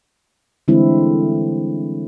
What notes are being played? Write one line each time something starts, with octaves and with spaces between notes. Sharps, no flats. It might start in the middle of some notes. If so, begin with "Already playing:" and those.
D3 E3 G3 G#3 C4 E4